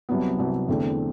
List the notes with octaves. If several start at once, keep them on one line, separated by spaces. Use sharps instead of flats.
C2 C3 F#3 B3
C2 C3 F#3 B3
E2 D3 A3 C4 E4